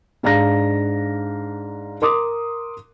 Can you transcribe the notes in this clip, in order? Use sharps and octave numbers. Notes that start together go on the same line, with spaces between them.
G#2 D4 F5 A#5 A#6
A#4 C6 D6 D#6